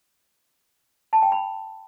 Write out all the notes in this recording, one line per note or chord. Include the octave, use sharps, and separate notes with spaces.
A5
G5
B5